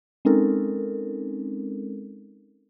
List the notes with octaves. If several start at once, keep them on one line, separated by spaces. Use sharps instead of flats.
G#3 C4 C#4 D#4 A4 A#4